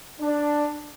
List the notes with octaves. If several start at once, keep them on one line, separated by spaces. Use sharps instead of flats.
D4